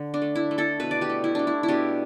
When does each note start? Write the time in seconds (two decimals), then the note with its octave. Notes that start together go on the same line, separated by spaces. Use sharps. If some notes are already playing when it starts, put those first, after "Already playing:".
Already playing: D3
0.14 D4
0.22 A3
0.35 E4
0.51 A3
0.58 E4 A4
0.80 B2 B4
0.91 D5
1.01 G4 B4
1.10 A3
1.24 E4
1.35 A3 D4
1.47 E4
1.63 E4
1.68 B2 D4 G4